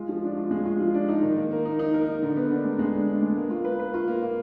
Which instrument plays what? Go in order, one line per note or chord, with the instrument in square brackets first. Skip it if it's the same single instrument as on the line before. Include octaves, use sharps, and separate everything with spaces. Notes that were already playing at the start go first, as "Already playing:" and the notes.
Already playing: [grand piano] G#3 F4
F3
D4
F4
G#3
F4
F3
D4
D#4
D#3
A#3
A#3
D#4
D#4
A#4
D#4
D3
B3
D4
G#3
G#3
D4
D4
G#3
A#3
F4
B4
B4
F4
A#3
A#3